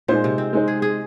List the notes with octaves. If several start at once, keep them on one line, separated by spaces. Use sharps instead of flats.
A#2 G#3 D#4 C5
C3
C4
G#3 D#4 C5
G#4
G#4